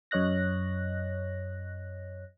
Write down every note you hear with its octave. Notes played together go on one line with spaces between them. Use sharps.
F#2 C#5 D#5 F#6 A#6